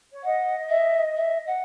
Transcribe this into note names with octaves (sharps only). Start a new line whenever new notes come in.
C#5
D#5 F#5
E5
E5
F#5